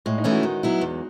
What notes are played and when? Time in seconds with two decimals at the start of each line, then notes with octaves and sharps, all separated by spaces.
0.06 A2 G#3
0.18 D#4
0.24 E3 A3 C#4 E4
0.31 F#4
0.43 D#3 F#4
0.63 F#3 B3 E4
0.81 E2